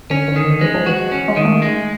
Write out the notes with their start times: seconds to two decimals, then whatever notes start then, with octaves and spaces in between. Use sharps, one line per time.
0.10 D3 C#4
0.28 D3
0.36 D#3
0.45 D3
0.61 E3 G#3
0.74 F3
0.86 E3 F#4
1.12 C#4
1.28 G#3
1.37 D#3
1.45 A3
1.62 G#3